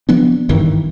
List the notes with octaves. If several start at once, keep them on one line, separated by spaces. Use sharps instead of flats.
F3 B3 D4
G#1 G2 D#3 E3